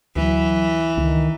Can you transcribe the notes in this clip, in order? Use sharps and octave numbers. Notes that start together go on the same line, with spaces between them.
D2 E3 F#3
C#2 D#3